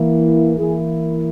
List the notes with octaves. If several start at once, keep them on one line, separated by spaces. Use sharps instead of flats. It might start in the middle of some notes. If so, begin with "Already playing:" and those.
Already playing: E3 A#3 E4
E3 A#3 E4 G#4